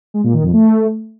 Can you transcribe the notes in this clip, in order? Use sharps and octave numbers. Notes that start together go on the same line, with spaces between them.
G#3
A#2
D#3
F2
A3